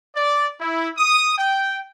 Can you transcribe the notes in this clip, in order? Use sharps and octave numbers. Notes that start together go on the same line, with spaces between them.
D5
E4
D#6
G5